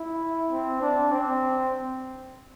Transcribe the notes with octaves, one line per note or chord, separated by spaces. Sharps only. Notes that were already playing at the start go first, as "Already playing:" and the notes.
Already playing: E4
C4
D4
C4